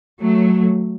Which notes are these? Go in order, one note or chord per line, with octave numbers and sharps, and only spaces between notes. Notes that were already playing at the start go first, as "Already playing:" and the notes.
F#3 A3